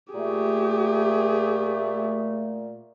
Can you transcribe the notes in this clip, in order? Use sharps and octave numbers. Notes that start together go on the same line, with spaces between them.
A#2 A3 G4 G#4